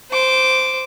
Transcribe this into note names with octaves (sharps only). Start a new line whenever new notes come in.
C5 D6